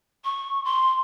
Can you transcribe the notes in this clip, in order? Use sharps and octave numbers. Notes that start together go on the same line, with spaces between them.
C#6
C6